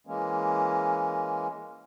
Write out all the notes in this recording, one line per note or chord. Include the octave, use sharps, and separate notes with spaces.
E3 G#3 A#3 C#4